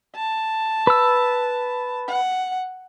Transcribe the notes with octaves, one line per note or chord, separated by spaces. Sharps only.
A5
B4 E6
F#5